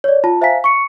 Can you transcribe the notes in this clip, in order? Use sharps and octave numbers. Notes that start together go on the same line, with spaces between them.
C#5 D5
F4 A5
C5 E5 F5 G#5 A#5 B6
C#6 C#7